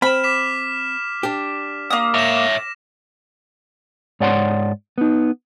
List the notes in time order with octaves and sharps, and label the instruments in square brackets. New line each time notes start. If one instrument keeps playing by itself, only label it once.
[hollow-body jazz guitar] C4 [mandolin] B5 [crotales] F6 E7
[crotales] D6 B6 E7
[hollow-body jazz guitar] D4 G4
[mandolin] A#3 D#6
[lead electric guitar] C#5 E5 [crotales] A#6 E7
[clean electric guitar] G#2 C#5 D5 F#5 B5 C6
B3 D#4